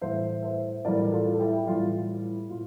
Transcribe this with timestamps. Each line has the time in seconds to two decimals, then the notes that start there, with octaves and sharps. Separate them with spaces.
0.01 A2 E3 G3 C5 E5
0.43 C5 E5
0.85 A2 E3 G3 A#4 D5
1.12 F4 A4
1.34 A4
1.39 E4 G4
1.67 A2 E3 G3 F4
1.96 F4
2.23 E4
2.50 A2 F4